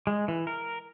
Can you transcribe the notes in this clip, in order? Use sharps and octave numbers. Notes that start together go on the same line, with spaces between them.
G#3
E3
A#4